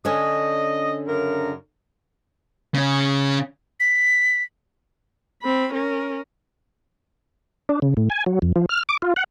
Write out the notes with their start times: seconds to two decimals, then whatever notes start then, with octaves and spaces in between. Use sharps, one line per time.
0.05 D3 C#4 C#5 D#5
1.07 F#2 C#3 A#4
2.74 C#3 C#4
3.80 B6
5.43 C4 B5
5.73 C#4 A#4
7.69 D4
7.82 C#3
7.97 A2
8.10 G#5
8.26 F#3
8.42 F2
8.56 F3
8.69 F6
8.89 D6
9.02 F4
9.16 F#5